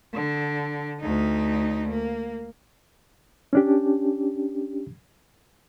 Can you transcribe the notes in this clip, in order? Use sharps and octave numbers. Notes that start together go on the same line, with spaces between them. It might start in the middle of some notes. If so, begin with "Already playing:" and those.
D3
D2 D#4
A#3
C#4 D4 G4